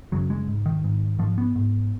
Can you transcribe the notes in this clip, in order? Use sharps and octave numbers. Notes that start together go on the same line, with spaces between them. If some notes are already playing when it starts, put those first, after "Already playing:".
F#2 C#3 F#3
G#3
G#2
D#3
G#2
G#2 F3
B3
G#2